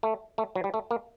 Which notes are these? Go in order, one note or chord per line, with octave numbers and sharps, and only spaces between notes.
A3
A3
F#3
G3
A3
A#3